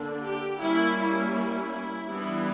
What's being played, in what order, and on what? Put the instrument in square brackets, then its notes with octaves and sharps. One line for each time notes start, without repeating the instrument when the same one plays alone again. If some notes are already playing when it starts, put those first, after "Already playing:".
Already playing: [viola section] D3 A#3 D4
G4
G3 A#3 C#4 E4
E4
E4
E3 G3 B3 D4